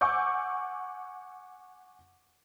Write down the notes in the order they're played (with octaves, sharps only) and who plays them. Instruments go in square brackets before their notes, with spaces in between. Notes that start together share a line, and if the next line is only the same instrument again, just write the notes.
[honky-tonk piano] F#5 G#5 C#6 D6 E6 G6